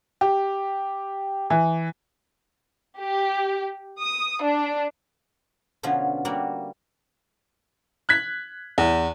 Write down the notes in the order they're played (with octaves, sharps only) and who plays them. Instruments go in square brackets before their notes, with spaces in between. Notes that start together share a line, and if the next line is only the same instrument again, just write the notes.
[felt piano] G4
E3
[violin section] G4
D#6
D4
[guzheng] B2 D3 F3 C#4 F4
G3 A#3 F#4 A#4 D5
[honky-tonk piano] F#6 G#6 B6
E2